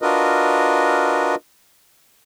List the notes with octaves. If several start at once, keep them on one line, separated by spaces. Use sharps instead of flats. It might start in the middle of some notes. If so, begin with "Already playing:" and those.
D4 F4 F#4 A#4 B4 D#5